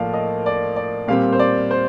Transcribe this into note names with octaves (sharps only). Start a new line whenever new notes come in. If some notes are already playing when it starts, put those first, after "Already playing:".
Already playing: A2 F3 A#3 D5 F5
D#5
D5
D5
A#2 G3 C4 F5
C5
D5
C5